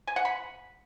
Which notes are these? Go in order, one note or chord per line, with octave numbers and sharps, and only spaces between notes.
G#5
F#5
B5